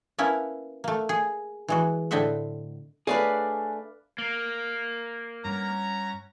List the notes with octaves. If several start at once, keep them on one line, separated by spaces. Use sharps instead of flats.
A#3 B3 C#4 E4 E5 A5
A3 A#3
G#4
E3 G#3 F#4
A2 D3 C4 D#5 E5 F#5
A3 D4 G#4 B4 C#5 D5 F5
A#3
G2 C#4 F#5 A#5